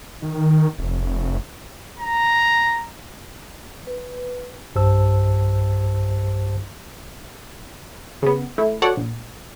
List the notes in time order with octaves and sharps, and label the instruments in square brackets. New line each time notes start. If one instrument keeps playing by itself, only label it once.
[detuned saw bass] D#3
F1
[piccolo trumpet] A#5
[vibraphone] B4
[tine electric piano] B1 G2 G4 C5 A5 E6
[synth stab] C#3 B3
A3 E4
F#4 A4 C#5 D5 F#5
A#1